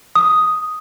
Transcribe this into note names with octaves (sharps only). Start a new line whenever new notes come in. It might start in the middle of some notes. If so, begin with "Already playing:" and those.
D#6